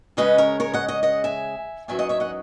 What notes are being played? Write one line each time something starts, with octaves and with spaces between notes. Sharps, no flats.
C#3 G#3 C#4 B4 D#5
A#4 C#5
A#4 C#5
D#5 F#5
D#5 F#5
D#5 F#5
E5 G#5
E2 D#3 F#3 C#4 E5 G#5
D#5 F#5
C#5 E5
D#5 F#5